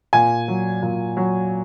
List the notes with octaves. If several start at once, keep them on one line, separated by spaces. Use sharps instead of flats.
A#2 G#5
F#3
A#2
F#3